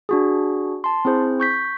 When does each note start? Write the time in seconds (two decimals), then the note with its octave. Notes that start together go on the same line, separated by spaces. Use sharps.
0.09 D4 F#4 G#4
0.84 A5 C6
1.05 C4 E4 G#4 C5
1.40 C#6 G6 B6